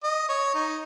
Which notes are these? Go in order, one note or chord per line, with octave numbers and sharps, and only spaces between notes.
D#5
C#5
D#4